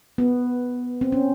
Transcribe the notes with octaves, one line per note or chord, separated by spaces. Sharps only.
B3
C4
C#4